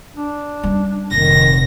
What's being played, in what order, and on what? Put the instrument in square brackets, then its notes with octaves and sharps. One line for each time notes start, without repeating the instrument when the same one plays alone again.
[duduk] D4
[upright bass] G3 C#4
[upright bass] F1 A#2 [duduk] D#3 [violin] A#6